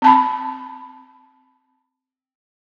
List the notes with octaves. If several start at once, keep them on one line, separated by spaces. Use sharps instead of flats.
C4 A5 B5